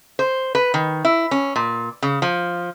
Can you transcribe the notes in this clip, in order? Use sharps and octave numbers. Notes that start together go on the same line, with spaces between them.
C5
B4
D#3
E4
C#4
A#2
C#3
F3